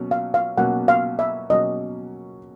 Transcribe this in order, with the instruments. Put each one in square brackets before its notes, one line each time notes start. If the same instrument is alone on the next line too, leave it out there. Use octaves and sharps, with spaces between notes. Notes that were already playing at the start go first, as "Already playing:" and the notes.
Already playing: [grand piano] B2 F#3 A#3 C#4
[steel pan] F5
F5
[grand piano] B2 F#3 A#3 C#4 [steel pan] F#5
[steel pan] F5
E5
[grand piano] B2 F#3 A#3 C#4 [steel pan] D#5